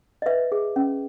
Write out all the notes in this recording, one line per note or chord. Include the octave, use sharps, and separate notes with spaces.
D#5
B4 E5
G#4
C#4